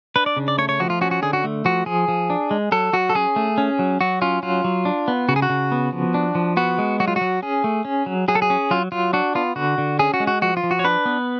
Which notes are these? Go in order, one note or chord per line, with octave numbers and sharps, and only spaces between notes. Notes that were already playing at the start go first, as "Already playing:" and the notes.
D4 B4
D5
C#3
D5
A3 C#5
C#5
F3 F#4
F4
C#4 F#4
F#4
D3 G#4
F#4
A3
F3 F#4
F3 G#4
F3
D4
G#3
F#3 A4
F#3 F#4
A4
C#4 G#4
A3
C#4
F#3
F#3 F#4
C#4 F4
F#3 F4
F#3
D4
B3
C#3 F#4
G#4
F#4
C#3
B3
F3
D4
F3
B3 F#4
G#3
F#3 F#4
F4
F#4
F#3
C#4 G#4
A3
C#4
F#3
F#3 G#4
A4
G#4
C#4
F#3 F4
F#3 F4
D4 F#4
B3 F4
D3 F#4
D3
C#4 G#4
F#4
G#3
F#4
F3 F#4
F4
F3
F#4
C#5
D4 B4
B3